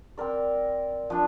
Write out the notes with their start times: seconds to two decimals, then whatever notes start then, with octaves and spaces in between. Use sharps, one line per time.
0.18 C4 A#4 D5
1.10 F3 D4